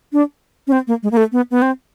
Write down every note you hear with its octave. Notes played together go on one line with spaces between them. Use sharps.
D4
C#4
C4
A#3
G#3
A#3
A3
B3
B3
C4